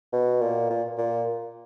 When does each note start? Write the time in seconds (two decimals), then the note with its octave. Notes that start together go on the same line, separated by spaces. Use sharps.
0.13 B2
0.41 A#2
0.70 A#2
0.98 A#2